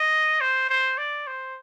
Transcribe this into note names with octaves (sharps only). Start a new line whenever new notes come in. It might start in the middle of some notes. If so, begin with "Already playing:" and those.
Already playing: D#5
C5
C5
D5
C5